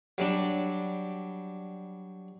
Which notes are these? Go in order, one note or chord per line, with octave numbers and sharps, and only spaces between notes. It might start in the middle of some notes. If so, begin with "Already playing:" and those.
F#3 G3 D4